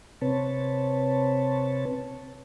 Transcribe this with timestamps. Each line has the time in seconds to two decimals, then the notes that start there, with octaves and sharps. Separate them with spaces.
0.21 C3 C4 B4 C#5 A5